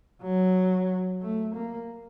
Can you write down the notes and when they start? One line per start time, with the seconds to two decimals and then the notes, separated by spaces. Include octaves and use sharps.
0.22 F#3
1.22 A3
1.55 A#3